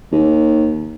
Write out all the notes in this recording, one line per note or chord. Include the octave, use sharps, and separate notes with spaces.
D#2